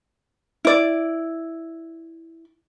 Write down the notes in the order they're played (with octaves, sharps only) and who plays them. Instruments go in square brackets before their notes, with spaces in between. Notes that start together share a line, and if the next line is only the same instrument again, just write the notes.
[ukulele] E4 D5